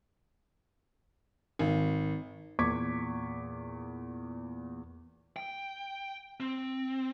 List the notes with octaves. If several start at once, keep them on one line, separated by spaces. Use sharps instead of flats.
G#1
E2 A#2 C#6 D6 G#6 B6
G5
C4